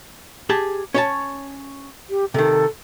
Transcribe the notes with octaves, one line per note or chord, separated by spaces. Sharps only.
G4 G#4 A5
C#4 C#5 A5
G4
C3 D#3 A4